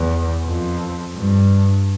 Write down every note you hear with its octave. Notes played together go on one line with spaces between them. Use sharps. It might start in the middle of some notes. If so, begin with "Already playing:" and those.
Already playing: E2
F2
G2